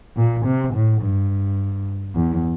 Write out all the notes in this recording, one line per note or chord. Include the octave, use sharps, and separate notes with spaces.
A#2
C3
A2
G2
E2